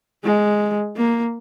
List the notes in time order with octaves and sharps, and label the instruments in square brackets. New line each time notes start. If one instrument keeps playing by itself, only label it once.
[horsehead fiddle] G#3
A#3